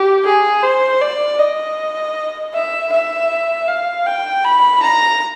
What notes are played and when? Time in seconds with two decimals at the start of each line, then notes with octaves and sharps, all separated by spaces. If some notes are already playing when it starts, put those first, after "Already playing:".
Already playing: G4
0.24 G#4
0.63 C5
1.01 D5
1.39 D#5
2.54 E5
2.92 E5
3.68 F5
4.06 G5
4.45 B5
4.83 A#5